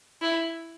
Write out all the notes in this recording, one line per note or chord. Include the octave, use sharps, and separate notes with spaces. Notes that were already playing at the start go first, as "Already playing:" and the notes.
E4